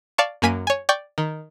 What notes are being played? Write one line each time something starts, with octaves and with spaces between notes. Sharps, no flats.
D5 F5 A5 C#6
F#2 A#3 G#5 B6 D#7
C#5 G#5
D5 G5 C#6 G6
D#3